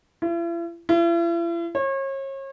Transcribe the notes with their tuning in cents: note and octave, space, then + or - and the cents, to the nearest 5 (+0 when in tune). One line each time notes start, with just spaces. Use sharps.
E4 +45
E4 +45
C#5 -35